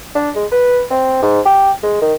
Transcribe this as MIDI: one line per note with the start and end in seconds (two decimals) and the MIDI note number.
0.15 0.31 62
0.36 0.46 56
0.52 0.82 71
0.90 1.18 60
1.22 1.40 44
1.46 1.71 67
1.83 2.00 56
2.02 2.14 51